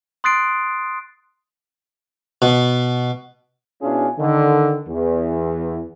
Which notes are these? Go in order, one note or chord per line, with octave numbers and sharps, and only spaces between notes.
C6 D#6 F#6 A6 C7 D7
B2
B2 C#4 D4 E4 F4 G#4
D3 D#3
E2